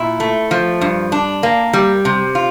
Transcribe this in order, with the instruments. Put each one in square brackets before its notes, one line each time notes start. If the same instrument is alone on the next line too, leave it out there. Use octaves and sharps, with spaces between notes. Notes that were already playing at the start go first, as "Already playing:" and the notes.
Already playing: [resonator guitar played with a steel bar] A#2 E4
A3
F3
G2
D4
A#3
G3
C3
F4